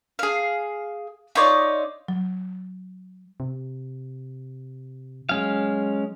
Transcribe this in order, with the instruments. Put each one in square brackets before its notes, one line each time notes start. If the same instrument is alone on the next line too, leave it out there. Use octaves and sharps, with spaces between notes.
[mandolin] G#4 F5
D#4 F4 C#5 D5
[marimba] F#3
[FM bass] C3
[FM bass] F#3 [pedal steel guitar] G#3 C#4 F5